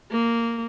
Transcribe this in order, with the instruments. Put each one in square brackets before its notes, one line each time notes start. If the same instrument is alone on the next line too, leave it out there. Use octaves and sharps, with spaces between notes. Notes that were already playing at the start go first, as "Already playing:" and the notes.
[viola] A#3